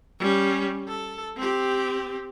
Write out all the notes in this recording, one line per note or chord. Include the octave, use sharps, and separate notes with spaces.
G3 C#4
A4
C4 G4